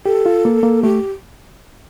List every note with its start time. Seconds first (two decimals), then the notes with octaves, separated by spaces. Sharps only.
0.06 G4 A4
0.26 F4
0.45 A#3
0.63 A#3
0.83 A3 G4